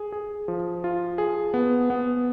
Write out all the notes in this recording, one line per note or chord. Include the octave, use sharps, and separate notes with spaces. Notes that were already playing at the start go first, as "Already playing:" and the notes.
Already playing: G#4
G#4
F3
F4
G#4
B3
B3